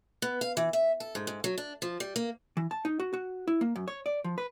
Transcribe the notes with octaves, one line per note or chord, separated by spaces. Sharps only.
B3
F5
E3
E5
A4
G#2
G#2
F#3
D4
F3
G3
A#3
E3
A5
D#4
F#4
F#4
E4
A#3
F#2
C#5
D5
F3
B4